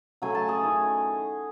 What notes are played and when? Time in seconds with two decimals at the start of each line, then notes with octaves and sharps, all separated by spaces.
0.22 C#3 F#3 A3 G#5
0.35 A5
0.48 G#4 G#5
0.62 D#3 A3 E4